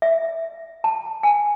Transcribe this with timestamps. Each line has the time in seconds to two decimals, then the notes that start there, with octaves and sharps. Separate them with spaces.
0.02 E5
0.84 A5
1.23 G#5